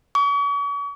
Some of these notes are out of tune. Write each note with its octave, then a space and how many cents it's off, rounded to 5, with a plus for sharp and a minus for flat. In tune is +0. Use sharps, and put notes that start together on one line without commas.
C#6 +40